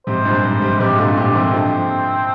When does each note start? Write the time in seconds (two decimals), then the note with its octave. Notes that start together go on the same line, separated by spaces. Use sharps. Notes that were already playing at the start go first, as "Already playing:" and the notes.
0.07 G#2 C3 C5
0.25 G2 A#2
0.44 G#2
0.62 G#2 C3
0.80 G#2 C3 G4
0.98 A#2 D3 F4
1.17 A#2 D3 G4
1.35 C3 D#3 C4
1.53 D3 F3